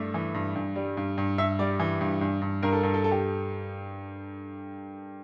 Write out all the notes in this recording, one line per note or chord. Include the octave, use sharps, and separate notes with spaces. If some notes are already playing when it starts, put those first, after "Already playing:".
Already playing: G2 A3 D5 E5
E3
G2
G2
G3
G2
G2
G2 E5
G3 D5
E3
G2
G2
G2
G2 A#4
A4
G2 A4
A4
A4
G4